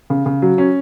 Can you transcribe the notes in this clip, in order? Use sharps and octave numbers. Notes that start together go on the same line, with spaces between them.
C#3
C#3
F#3
C#4